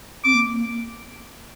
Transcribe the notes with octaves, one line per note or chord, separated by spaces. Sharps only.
C4 D6
A#3
A#3